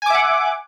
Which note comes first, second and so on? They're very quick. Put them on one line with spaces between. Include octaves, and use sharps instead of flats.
G#5 D6 E5 F#5